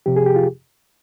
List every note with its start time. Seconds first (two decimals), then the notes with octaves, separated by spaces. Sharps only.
0.06 C3 F3 G4
0.16 G#4
0.26 G4
0.36 F4